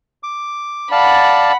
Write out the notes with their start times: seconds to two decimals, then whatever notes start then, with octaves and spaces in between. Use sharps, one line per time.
0.23 D6
0.92 D5 F5 F#5 A5 B5